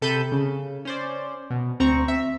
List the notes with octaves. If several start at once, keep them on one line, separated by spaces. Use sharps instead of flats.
C3 A4 B5 G6 D#7
C#3
C#4 C5 D5
B2
D2 C4 A#5 C#6
E5